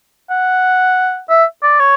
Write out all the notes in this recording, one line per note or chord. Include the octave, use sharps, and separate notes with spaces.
F#5
E5
D5
C#5